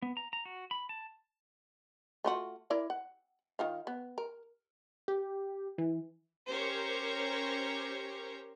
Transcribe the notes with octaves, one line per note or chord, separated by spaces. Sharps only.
B3
A#5
A#5
F#4
B5
A5
A3 F4 F#4
E4 A#4 D5
F#5
D#3 F4 F5
B3
A#4
G4
E3
C#4 G4 A#4 C5 C#5 A#5